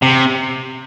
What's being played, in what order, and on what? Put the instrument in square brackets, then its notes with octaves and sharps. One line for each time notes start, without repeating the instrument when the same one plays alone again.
[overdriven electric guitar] C3